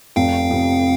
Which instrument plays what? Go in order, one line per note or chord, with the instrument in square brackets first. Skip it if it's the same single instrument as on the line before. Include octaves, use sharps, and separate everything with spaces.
[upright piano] F1 [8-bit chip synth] F5 G5
[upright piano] F2 C3